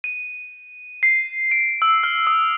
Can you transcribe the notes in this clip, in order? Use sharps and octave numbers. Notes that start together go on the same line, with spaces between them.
D#7
C7
D7
E6
F6
D#6